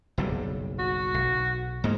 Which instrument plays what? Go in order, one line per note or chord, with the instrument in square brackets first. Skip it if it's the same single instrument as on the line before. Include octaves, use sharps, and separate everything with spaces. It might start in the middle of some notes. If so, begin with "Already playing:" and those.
[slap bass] F#1 B1 G3
[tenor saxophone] F#4
[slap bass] B1
[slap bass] G#2 A#3 [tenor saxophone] D#4